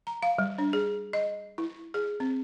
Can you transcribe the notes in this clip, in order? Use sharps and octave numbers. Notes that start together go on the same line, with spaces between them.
A#5
F5
G3
D4
G#4
D#5
E4
G#4
C4